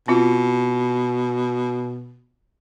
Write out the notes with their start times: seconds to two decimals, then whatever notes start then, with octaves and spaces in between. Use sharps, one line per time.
0.08 B2 C4 F4